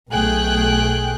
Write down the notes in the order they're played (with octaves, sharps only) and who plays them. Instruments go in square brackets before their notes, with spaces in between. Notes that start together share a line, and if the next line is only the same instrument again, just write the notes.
[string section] B1 A3 G#4 G5 F#6